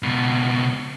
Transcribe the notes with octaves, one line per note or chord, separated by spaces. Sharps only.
C#2 B2